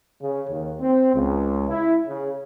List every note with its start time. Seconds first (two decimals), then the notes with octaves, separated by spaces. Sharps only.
0.21 C#3
0.50 D#2
0.81 C4
1.15 C#2
1.69 E4
2.06 C#3